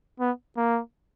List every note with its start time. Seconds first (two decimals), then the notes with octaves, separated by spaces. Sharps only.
0.20 B3
0.57 A#3